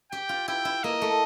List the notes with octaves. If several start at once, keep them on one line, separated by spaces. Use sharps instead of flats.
G4 G5
F4
E4 G5
E4
A#3 D#5
A3